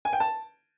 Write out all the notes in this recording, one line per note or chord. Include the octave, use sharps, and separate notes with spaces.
G#5
G5
A5